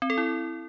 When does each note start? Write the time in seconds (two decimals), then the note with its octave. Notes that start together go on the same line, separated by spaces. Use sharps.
0.02 C4
0.10 A4
0.18 E4